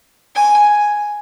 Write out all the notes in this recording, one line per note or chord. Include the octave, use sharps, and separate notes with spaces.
G#5